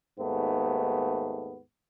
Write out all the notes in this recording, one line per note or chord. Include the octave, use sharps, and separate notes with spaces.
D#2 G#2 A3 B3